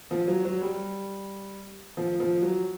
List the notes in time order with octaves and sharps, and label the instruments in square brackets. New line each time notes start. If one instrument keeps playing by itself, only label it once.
[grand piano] F3
F#3
F#3
G3
F3
F3
F#3